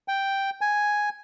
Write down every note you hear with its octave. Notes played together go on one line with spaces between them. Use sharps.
G5
G#5